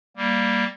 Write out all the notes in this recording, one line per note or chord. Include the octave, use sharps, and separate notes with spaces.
G3 A#3